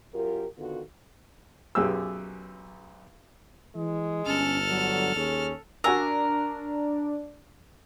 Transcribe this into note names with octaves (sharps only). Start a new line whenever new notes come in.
F#2 F4 G4 A#4
D3 D#3 B3 F4 F#4 A4
B1 F#2 G4 G#4 E6
E3 G#3
G1 C#4 A4 F6
D3 F#3
D#2 C#4 G#4
D4 F#4 A#4 G#5 E6